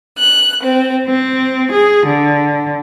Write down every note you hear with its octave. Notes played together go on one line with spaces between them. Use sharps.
F#6
C4
C4
G#4
D3